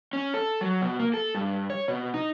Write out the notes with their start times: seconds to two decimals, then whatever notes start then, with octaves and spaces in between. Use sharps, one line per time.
0.13 C#4
0.34 A4
0.61 F#3
0.81 B2
0.99 A#3
1.14 A4
1.35 G2
1.70 C#5
1.88 B2
2.14 D#4